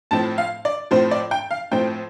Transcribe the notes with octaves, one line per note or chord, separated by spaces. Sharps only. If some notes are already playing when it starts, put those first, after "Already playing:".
A2 F3 C4 A5
F5
D5
A2 F3 C4 C5
D5
G5
F5
A2 F3 C4 G5